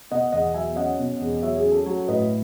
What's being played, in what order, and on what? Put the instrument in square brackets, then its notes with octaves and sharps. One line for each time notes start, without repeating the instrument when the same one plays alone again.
[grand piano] B2 D#5 F#5
E2 D#5 F#5
F#3 E5 G#5
C#4 D#5 F#5
B2
E2
F#3 C#5 E5
G#4
C#4
A4
F#3 A4 C#5
A2 B4 D#5